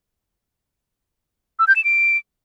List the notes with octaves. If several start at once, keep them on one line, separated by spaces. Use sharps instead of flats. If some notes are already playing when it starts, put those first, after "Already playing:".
E6
G6
E7
D7